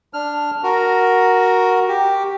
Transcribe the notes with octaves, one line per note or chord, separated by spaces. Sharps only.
D4 F6
F#4 A#4
G4